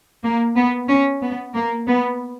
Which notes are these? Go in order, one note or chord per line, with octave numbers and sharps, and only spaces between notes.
A#3
B3
C#4
B3
A#3
B3